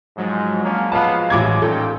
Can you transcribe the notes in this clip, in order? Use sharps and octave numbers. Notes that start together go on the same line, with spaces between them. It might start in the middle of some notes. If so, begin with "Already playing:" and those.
G#2 F3 F#3 G#3
A#3 C#4 D4
B3 F5 A5
A1 G2 C#3 E4 D6 G#6
A#2 C#4 D#4 A4 G5